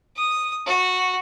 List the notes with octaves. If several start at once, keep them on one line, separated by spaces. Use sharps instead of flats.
D#6
F#4